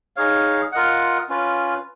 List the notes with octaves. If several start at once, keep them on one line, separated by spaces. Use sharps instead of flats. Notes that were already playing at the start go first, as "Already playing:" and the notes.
D#4 G#4 C#5 F5
F4 A#4 D#5 F#5
C#4 F4 B4